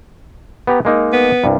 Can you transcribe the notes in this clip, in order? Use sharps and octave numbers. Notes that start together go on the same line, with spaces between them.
B3 G4 A#5
G#3 A#3 D#4
B3
C2 G2